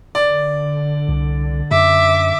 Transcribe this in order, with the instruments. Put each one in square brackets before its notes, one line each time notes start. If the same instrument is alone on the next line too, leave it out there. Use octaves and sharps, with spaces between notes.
[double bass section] D3 [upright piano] D5
[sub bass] C2
[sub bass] F#2 [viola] E5 D6